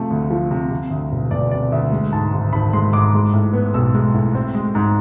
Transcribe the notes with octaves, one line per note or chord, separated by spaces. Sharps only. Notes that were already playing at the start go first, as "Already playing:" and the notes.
Already playing: C3 F3 A3
D2
F3
C3
C3
D2
E1
E1 D5
C3 D5
D2 E5
G#3
G#2 A5
G#1
G#1 B5
G#3 C6
G#2 D6
G#3
A2
B3
B1 E6
G#3
A2
C4
G#3
G#2